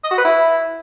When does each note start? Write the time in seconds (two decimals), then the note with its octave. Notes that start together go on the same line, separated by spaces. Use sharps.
0.04 D#5
0.11 F#4
0.18 B4
0.25 E4